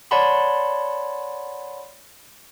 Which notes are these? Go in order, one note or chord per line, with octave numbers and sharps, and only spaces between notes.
C#5 D5 F#5 A5 B5 C6